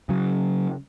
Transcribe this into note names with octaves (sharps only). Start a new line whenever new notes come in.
C#3 F#3